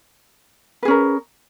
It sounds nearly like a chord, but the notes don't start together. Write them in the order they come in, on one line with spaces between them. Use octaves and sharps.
B4 G#4 C#4 A#4